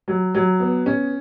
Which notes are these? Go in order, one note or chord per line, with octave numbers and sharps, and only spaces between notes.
F#3
F#3
B3
C#4